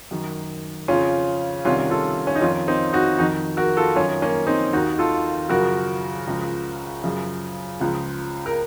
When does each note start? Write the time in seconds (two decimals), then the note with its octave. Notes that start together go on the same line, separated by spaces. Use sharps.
0.11 F#2 D#3
0.88 F2 C#3 F3 C#4 F4
1.65 C2 C3 D#3 C#4 F4
1.90 F4 A4
2.27 C#4
2.35 D#4
2.41 F2 D#3 C#4 F4
2.68 C4 D#4
2.93 D#4 F#4
3.18 F2 D#3 D#4 F#4
3.57 F#4 A#4
3.77 F4 A4
3.95 F#2 D#3 C#4 F4
4.22 A#3 C#4
4.47 C4 D#4
4.73 D#2 D#3 D#4 F#4
4.99 F4 A4
5.49 F#2 C#3 F3 F#4 A#4
6.27 C#2 C#3 F3
7.03 F#2 C#3 F3
7.80 C#2 C#3 F3
8.46 A#4